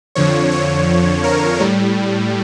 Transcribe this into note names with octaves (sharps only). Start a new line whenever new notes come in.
F2 D3 F3 C#5
C#5
A#4
A2 G3